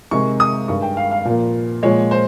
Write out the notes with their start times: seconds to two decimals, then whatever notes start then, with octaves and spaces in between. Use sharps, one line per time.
0.11 C3 D#3 G#3 C#6
0.40 D#6
0.68 G2 D#3 G#3 C#6
0.82 G5
0.97 F5
1.11 F5
1.25 A#2 F3 A#3
1.83 A#2 F3 G#3 C#5
2.11 C5